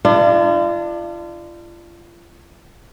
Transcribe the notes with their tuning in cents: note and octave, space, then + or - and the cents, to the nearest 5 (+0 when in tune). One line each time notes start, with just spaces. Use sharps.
D4 +25 F4 -35